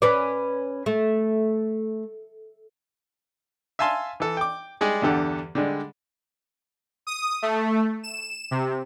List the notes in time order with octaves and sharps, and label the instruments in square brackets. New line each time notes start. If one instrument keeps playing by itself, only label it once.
[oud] C#4 B4 D5
A3
[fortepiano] E5 F5 G#5 A5 C6
E3 A4
G5 D6
G3 G#3 G#4 D5
E2 G2 D3 G4 A4 F#5
D3 G3 G#3
[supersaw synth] D#6
A3
E7
C3